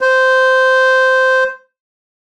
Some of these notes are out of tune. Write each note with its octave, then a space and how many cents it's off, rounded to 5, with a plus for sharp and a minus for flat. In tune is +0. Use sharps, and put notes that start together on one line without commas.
C5 -10